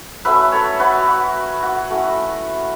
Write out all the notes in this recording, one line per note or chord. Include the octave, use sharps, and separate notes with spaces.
F#3 A3 C#4 B4 E5
A4 C#5
F#4 B4
F#4
F#4
A3 C#4 E4 F#4